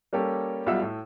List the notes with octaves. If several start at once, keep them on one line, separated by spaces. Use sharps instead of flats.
G3 A#3 C#4 G4 A4
B1 G3 F4 E5 F#5 E6
A2